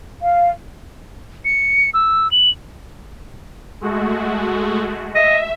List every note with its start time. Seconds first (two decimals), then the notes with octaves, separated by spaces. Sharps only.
0.22 F5
1.45 C#7
1.94 E6
2.31 F#7
3.81 G#3 A3 F#4
5.15 D#5 E5